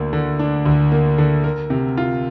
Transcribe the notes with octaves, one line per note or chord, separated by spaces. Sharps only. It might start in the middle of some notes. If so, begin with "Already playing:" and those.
Already playing: D2 A#3 D4
D3
D4
D2
A#3
D3
A#4
C3
F4